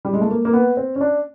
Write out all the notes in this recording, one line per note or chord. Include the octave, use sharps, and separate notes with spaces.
G3
G#3
A3
A#3
A#3
B3
C4
C#4
D4